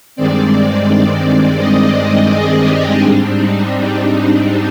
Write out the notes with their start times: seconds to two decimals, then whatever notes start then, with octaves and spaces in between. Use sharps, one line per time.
0.16 G2 D#3 G#3 C4 D5
1.58 D#5
2.29 G#4
2.64 G4
2.99 G#2 G3 C4 D4
3.35 D#4
3.70 D4